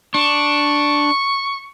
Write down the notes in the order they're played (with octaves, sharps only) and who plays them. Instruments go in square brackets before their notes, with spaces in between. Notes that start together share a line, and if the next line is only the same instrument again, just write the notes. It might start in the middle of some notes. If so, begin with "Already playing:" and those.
[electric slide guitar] D4 [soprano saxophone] C#6